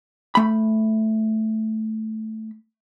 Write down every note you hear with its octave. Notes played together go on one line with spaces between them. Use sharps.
A3 B5